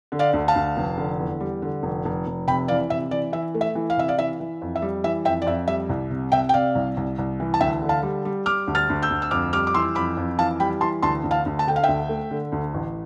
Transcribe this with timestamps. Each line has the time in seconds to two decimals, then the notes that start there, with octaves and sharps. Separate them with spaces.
0.12 D3
0.19 D5 F5
0.33 D2
0.48 F5 A5
0.55 D2
0.77 F1
0.97 D3
1.20 E2
1.40 G3
1.62 D3
1.83 F1
2.05 F1
2.27 F1
2.47 C3 G5 B5
2.68 E3 D5 F5
2.90 C3 E5
3.11 E3 D5
3.33 E3 E5
3.55 A3
3.61 E5
3.75 E3
3.90 F5
3.97 C3 E5
4.08 D5 F5
4.18 E3 E5
4.40 E3
4.62 F2
4.76 E5
4.82 G3
5.04 E3 E5
5.25 F2 E5 G5
5.42 D5
5.46 F2 E5
5.68 G3 E5
5.89 C2
6.10 C3
6.32 C3 E5 G5
6.49 G5
6.54 C3 D5 F5
6.75 C2
6.97 C2
7.18 C2
7.40 E3
7.54 A5
7.60 D2 E5 G5
7.82 D3
7.89 F5 A5
8.03 G3
8.25 G3
8.46 G3 D6 F6
8.67 D2
8.75 F6 A6
8.89 D2
9.03 E6 G6
9.10 D2
9.22 E6
9.31 F2 D6 F6
9.53 G3 D6 F6
9.67 D6
9.74 E3 C6 E6
9.95 F2 B5 D6
10.17 F2
10.38 E3 F5 A5
10.60 G3 G5 B5
10.81 E3 A5 C6
11.02 D2 A5 C6
11.24 D2
11.31 F5 A5
11.46 D2
11.59 A5
11.67 D3 G5
11.76 F5
11.83 D2 E5 G5
12.09 A3
12.31 D3
12.52 D2
12.74 A1